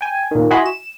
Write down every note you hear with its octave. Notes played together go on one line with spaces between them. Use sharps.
G5 G#5
A#2 D#3
E4 F#4 D#5 G#5 B5 C6
E7